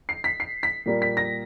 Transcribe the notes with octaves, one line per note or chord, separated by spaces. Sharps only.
C7
B6
C7
B6
A#2 G3 A#3
B6
A#6